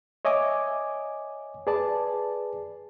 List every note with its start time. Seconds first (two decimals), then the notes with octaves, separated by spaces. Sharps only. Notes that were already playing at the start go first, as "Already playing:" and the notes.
0.25 C#5 D#5 E5 G#5 D6
1.67 G#4 B4 D5 A5